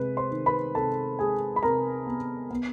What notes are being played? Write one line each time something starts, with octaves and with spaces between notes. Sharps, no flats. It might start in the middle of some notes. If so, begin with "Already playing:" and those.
Already playing: C3 G#3 B4
C5 C6
D#3
B4 B5
C3 A4 A5
G#3 G#4 G#5
B5
C3 A#4 A#5
B3
B3